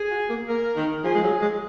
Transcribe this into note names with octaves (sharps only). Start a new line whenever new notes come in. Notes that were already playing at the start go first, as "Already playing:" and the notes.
Already playing: G#4
F#4
A#3
A#3 A#4
D#3
F3 G#4
G#3
F#3
G#3